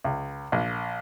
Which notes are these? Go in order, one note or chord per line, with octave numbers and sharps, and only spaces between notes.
C#2
A#1